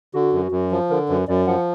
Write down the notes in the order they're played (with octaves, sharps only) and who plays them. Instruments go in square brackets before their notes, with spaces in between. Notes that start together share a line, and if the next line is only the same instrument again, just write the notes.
[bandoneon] D3 [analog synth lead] F#4
[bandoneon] F#2
F#2
F3
[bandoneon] D3 [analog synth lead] A#4
[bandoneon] F#2 [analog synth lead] B4
[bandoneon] F#2 [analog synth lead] D5
[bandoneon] F3 [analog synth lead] F#5